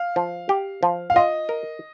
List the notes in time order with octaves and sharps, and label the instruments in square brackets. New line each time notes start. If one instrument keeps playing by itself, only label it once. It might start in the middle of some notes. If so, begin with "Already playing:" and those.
Already playing: [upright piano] F5
[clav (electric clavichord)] F3
G4
F3
[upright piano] F5
[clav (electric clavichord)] F4 [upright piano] D#5
[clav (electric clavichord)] A#4